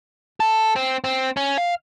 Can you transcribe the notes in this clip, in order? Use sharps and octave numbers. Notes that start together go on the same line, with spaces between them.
A4
C4
C4
C#4
F5